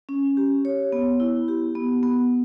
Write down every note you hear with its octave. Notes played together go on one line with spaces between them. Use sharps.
C#4
G4
C#5
B3
E4
G4
B3
B3